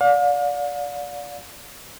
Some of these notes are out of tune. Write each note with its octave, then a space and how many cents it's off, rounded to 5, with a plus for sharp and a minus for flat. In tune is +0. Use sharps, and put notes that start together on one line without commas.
D5 -20 F5 +40